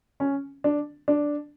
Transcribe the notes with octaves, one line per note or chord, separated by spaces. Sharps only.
C#4
D4
D4